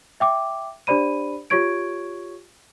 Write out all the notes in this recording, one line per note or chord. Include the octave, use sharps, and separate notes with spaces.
E5 G5 D6
D4 G4 C5 D5 B5 D#7
F4 G4 C#5 C#6 G#6 D7